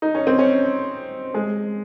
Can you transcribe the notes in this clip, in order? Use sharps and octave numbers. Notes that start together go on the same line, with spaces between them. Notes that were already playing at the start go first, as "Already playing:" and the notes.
D#4
C#4
C4
C#4
G#3